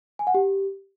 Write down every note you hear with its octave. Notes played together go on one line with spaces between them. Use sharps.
G#5
F#5
G4